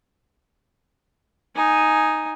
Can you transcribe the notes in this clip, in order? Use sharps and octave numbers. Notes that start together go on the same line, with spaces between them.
D#4 G#5